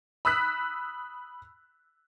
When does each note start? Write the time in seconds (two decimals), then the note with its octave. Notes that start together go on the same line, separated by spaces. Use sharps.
0.25 B5 D#6 E6 F#6 B6